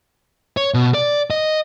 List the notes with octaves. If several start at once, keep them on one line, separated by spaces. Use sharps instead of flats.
C#5
B2
D5
D#5